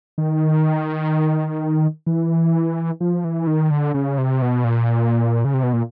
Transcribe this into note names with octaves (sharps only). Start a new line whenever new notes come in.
D#3
E3
F3
E3
D#3
D3
C#3
C3
B2
A#2
C#3
C3
B2
A#2